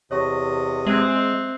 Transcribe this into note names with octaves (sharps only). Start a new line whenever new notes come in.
E2 C3 C#5 D#5 C#6 A#6
G#3 C4 E5 F#6